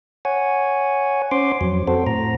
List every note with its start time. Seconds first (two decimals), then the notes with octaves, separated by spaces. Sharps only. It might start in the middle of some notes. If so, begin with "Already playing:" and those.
0.25 C#5 F#5 G#5
1.31 C#4 C5 C6 D6
1.61 F2 F#3
1.87 C4 F#4 A4 C5
2.07 A2 A#5